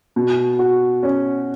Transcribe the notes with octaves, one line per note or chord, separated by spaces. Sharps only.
B2
F#4
C#4